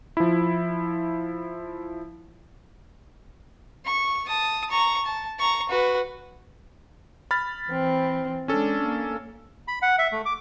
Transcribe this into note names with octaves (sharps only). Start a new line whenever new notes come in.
F3 E4
C#6
A5 D#6
A#5 C#6
A5
A#5 C#6
F#4 B4
B5 F6 A6
E3 C4
G#3 C#4 D4 A4
A#3
B5
F#5
E5
A3
D6